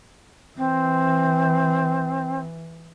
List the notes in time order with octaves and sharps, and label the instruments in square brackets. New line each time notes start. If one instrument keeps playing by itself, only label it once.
[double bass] E3 [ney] C4